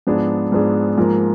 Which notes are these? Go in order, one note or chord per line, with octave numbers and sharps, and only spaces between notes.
G#2 F3 B3 D4 G#4
G#2 F3 B3 D4 G#4
G#2 F3 A#3 F4 A#4